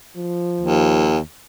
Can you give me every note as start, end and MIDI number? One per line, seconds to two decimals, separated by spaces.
0.17 1.18 53
0.61 1.18 39